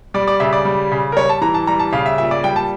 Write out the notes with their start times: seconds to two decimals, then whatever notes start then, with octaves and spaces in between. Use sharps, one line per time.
0.14 G3 D5
0.28 D5
0.40 C#3 E5
0.53 D5
0.65 G3
0.92 C#3
1.12 A#4
1.16 G3 C#5
1.29 A5
1.42 E3 A#5
1.54 A5
1.67 G3 A#5
1.79 A5
1.93 C#3 F5
2.06 E5
2.18 A#2 E5
2.31 D5
2.44 G3 G5
2.56 A5